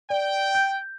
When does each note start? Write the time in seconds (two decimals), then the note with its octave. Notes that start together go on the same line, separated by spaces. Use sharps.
0.10 D5 G5
0.55 G6